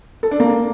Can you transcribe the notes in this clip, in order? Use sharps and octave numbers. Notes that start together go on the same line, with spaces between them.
A4
D4
A#3